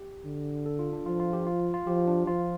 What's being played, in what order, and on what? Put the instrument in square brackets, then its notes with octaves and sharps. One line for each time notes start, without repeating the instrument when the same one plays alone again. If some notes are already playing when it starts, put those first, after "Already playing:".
Already playing: [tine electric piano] G4
[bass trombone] D3
[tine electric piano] A4
F4
D4
[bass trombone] F3 [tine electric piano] F4
[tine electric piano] F4
G4
F4
F4
[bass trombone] F3 [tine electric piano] G4
[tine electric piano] D4
[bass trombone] F3 [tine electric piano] F4